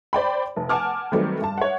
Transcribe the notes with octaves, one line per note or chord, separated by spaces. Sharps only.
C5 D5 G5 B5
F1
F#5 G#5 A5 D6 F6
D#3 F#3 G3 A3 C4 B4
G2 A5
C#5 E5 F#5